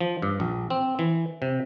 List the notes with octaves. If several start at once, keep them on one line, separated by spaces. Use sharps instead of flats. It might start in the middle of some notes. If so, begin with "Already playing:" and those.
F3
G2
A#1
C4
E3
C3